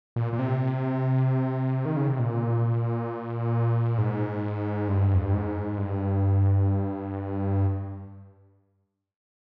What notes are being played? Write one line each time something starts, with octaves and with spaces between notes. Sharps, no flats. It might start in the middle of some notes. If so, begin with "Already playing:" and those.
A#2
A#2
C3
D#3
C#3
C3
A#2
G#2
G2
F2
G2
G#2
G2